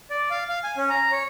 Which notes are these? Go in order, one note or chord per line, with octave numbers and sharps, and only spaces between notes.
D5
F5
F5
G#5
C#4
A#5
C#5